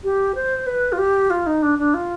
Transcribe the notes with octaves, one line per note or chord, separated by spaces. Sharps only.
G4
C5
B4
F4
G4
F4
D#4
D4
D4
F4